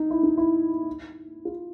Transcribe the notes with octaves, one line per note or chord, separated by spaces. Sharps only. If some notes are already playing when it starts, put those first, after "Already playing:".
Already playing: D#4
E4
D#4
E4
F4